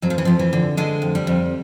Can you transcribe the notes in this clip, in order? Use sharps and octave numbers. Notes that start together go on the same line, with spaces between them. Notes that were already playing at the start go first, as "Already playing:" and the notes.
F2 F#3
F3
E3
F2 F3
E3
D3
D3 G#3
F2
G3
F2